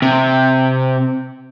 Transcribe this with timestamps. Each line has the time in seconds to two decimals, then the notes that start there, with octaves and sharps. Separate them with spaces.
0.02 C3